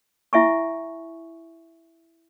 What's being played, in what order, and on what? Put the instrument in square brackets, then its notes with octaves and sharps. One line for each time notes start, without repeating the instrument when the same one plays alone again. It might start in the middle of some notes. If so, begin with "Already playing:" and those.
[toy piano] E4 E5 G#5 C#6